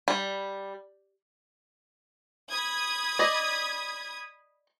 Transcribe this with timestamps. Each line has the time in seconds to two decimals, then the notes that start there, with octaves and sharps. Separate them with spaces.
0.08 G3
2.50 B5 D#6 G#6
3.19 D5 D#5